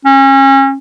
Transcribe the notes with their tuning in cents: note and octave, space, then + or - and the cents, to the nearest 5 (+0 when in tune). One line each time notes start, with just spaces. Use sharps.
C#4 -30